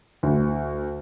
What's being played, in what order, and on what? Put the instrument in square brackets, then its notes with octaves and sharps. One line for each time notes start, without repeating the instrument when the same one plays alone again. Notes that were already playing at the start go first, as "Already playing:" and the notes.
[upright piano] D2